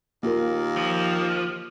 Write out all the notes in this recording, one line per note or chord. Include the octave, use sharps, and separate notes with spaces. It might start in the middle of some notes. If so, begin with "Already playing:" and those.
D#2 A#3 F4 A#4
F3